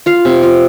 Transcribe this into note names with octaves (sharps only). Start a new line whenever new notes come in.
F4 F5
C3
F4